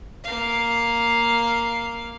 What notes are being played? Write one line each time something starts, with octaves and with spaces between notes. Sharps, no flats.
A#3 F5